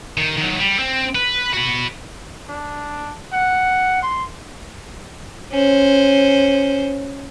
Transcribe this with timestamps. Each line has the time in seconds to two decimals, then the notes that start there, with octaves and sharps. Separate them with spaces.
0.17 D#3
0.37 D#3 F#3
0.60 G3
0.79 C4
1.15 B4
1.53 F#4 B4
2.49 D4
3.33 F#5
4.03 C6
5.52 C#4 C5